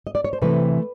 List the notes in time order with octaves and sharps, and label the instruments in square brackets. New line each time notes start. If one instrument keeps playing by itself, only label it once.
[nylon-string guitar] D#5
D5
C#5
C5
C3 E3 A3 B4